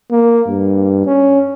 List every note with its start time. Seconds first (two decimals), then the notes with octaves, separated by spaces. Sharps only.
0.11 A#3
0.48 G2
1.06 C#4